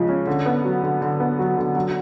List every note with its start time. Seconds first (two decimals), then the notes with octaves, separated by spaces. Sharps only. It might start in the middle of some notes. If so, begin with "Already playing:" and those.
Already playing: C#3 F3 G#3
0.09 C#4
0.27 D3
0.46 B3
0.65 F#3
0.83 D3
1.02 D3
1.20 B3
1.39 F#3
1.57 D3
1.76 F#3